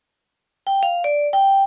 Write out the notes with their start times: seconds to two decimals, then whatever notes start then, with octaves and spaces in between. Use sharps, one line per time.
0.67 G5
0.83 F5
1.04 D5
1.33 G5